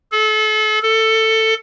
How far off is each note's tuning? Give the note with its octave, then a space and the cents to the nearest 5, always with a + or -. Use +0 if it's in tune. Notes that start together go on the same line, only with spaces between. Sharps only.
A4 -35
A4 +15